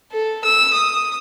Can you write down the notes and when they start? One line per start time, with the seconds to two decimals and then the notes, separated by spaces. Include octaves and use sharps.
0.12 A4
0.44 E6
0.74 D#6